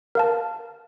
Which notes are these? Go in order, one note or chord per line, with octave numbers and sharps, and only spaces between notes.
A#4 F5 A5